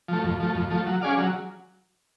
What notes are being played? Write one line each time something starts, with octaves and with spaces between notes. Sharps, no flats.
F3 A3
F2
F3 A3
F2
F3 A3
F#3
C#4 G#4 D5 F5
F#3